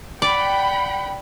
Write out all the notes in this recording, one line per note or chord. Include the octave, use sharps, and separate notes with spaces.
D5 F#5 G5 B5